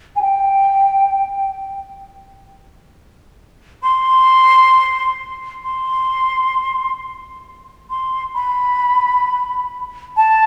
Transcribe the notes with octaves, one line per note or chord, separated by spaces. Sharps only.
G#5
G5
C6
C6
C6
B5
A5